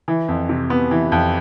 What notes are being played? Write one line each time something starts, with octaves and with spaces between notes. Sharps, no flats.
E3
F2
C3
B3
E3
F2